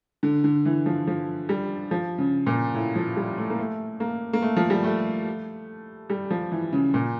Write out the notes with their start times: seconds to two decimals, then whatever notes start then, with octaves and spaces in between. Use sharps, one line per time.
0.23 D3
0.44 D3
0.65 E3
0.86 F3
1.07 F3
1.49 G3
1.91 F3
2.18 C#3
2.47 A#2
2.74 A2
2.95 F3
3.16 G3
3.38 A3
3.50 A#3
3.59 A3
4.00 A#3
4.33 A#3
4.42 A3
4.56 F3
4.70 G3
4.84 A3
6.10 G3
6.30 F3
6.52 E3
6.73 C#3
6.94 A#2